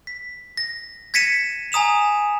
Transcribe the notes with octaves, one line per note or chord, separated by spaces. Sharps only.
B6
A#6
G#6 A#6 B6 C#7 D#7 E7
G#5 A#5 D#6 E7 F7